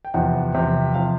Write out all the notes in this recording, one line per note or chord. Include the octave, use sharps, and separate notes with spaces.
G5
E2 C3 F3 F#5
E2 C3 F3
C3 F3 F5